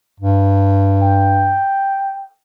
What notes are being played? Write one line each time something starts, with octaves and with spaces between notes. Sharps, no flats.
G2
G5